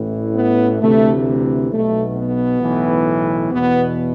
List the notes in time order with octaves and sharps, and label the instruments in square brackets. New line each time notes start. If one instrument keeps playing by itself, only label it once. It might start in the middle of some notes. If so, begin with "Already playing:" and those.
Already playing: [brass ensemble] A1 A2 E3
B3
D2 C3 E3 A3
B1 B2 A3
B3
B1 A2 E3
E2 B2 B3